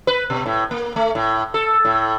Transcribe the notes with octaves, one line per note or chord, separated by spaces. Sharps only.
B4
B2
A2
A#3
A3
A2
A4
A2